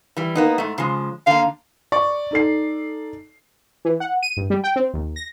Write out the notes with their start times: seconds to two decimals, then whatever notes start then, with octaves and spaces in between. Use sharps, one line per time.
0.17 E3 G3
0.35 A#3 B3 D#4
0.58 G#2 A3
0.78 C#3 F3 G#3
1.27 D3 A#3 F5
1.92 D5 C#6
2.31 D#4 A4 C7
3.85 E3
4.00 F#5
4.23 D#7
4.37 G2
4.50 G3
4.64 G5
4.76 C4
4.93 D#2
5.16 A#6